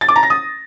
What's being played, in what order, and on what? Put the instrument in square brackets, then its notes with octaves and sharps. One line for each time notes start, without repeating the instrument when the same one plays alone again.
[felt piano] A6
D6
A#5
A#6
D#6